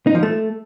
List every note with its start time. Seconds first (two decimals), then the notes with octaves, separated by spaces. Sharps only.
0.07 D#4
0.15 F3
0.23 A3